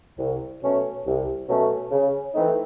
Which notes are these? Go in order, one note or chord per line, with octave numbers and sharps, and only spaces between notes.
C2
B2 F#3 A3 C#4
C2
B2 F#3 A3 C#4
C#3
E3 A3 C4 D#4